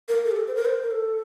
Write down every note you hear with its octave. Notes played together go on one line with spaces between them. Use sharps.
A#4
A4
G4
A4
C5
A#4
C5
A#4
A4